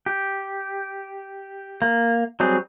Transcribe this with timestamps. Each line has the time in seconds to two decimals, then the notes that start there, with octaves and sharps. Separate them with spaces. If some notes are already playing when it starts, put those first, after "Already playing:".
0.06 G4
1.82 A#3
2.40 F#3 G3 C4 G#4